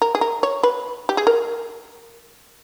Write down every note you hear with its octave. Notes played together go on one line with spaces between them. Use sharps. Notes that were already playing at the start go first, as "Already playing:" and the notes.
A#4
G#4
A#4
C#5
B4
G4
G#4
A#4